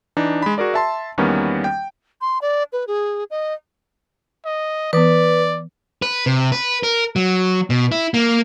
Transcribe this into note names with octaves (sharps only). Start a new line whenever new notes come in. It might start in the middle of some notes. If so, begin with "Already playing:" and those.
E3 D4 D#4
G#3 B5
F#4 G#4 A#4 D5
E5 A5 C6
E2 D#3 G3 A#3 B3 C#4
G5
C6
D5
B4
G#4
D#5
D#5
E3 B3 B4 D5
B4
C3
B4
A#4
F#3
B2
E4
A#3